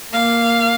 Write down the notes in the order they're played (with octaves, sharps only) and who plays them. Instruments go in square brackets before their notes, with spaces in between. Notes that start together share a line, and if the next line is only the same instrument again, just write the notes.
[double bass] A#3 [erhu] F5